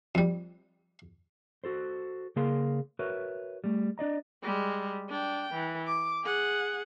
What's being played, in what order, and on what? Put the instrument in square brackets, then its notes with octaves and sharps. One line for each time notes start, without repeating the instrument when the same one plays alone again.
[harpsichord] F2 G3
[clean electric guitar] F#4 A4 C5
C#3 A#3 G#4 A#4 F5 C6
F#4 A#4 B4 C#5 E5
G3 A3
D4 D5 D#5 A#5
[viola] G3 G#3
D4 G5
E3
D6
G#4 F#5